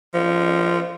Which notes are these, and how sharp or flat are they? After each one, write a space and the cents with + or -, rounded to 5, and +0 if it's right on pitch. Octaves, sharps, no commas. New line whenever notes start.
F3 -15